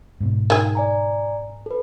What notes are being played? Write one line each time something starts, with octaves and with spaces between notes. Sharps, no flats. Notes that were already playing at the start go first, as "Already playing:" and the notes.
G#2 B2
D#3 G#4
D5 G#5 A#5
A4 B4